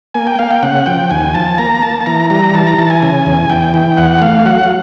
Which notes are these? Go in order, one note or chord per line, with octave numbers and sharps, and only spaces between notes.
A#3 G#5
G5
A#3 F5
G5
C#3 F#5
F3 G5
D#2 G#5
F3 A5
A#3 A#5
A#3 A5
A5
E3 A#5
G3 A#5
E3 A5
A#5
E3 A5
G#5
C#3
E2
E2 G5
E3
E2 F#5
A3 F5
F#3 F#5